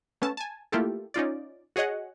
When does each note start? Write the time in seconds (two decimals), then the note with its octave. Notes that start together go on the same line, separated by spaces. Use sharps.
0.22 A3 B3 C#4 A5
0.37 G#5 A5
0.72 A3 A#3 E4 F4 G4 A4
1.14 C#4 D#4 F4 D5
1.76 F#4 G#4 C#5 D#5 F#5